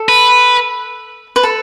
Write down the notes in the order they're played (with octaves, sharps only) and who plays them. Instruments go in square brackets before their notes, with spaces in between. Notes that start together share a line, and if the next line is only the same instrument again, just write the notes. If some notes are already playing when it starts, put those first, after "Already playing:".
Already playing: [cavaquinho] A4
[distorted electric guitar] B4
[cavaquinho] B4
A4